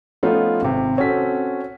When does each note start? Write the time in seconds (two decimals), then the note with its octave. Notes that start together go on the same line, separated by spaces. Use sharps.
0.23 F3 A3 B3 C#4 D#4 F4
0.62 G#1 C3
0.97 C4 C#4 F#4 A4 B6